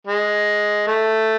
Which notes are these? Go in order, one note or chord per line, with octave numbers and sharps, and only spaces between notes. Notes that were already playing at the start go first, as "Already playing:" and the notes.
G#3
A3